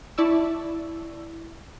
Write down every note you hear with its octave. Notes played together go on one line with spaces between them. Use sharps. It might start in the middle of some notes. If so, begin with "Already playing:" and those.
E4 D5 A5 C#6 E6